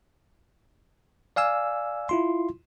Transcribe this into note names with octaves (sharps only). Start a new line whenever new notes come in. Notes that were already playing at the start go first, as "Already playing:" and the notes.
D5 F5 G#5 E6
E4 F4 C6